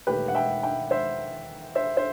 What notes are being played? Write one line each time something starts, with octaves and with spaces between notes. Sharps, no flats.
E1 D#2 D#3 A3 G4 B4
F#5
E5 G5
E5 G5
C5 E5
C5 E5
C5 E5